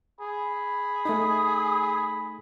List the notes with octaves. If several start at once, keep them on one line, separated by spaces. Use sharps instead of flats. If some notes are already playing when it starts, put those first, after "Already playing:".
G#4 B5
A3 D#4 D#6